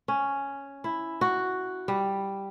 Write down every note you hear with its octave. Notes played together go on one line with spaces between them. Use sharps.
C#4
E4
F#4
G3